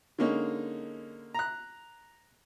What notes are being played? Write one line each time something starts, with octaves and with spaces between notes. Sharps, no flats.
D3 G#3 A#3 C#4 D#4
A#5 F#6